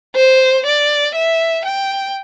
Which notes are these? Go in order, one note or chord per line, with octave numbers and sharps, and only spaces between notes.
C5
D5
E5
G5